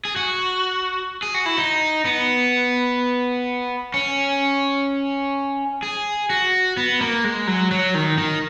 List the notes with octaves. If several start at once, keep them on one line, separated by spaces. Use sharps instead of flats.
G#4
F#4
G#4
F#4
E4
D#4
B3
C#4
G#4
F#4
B3
A#3
G#3
F#3
F#3
D#3
D#3